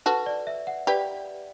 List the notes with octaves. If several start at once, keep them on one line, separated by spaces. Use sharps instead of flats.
F#4 A4 B4
D5
E5
F#5
G4 B4 D5